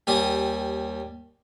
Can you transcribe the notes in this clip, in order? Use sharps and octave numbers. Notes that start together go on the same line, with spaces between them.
D#2 G3 G#5 D#6